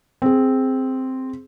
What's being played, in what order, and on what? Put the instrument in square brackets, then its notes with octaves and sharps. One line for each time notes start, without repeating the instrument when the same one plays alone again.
[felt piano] C4 G#4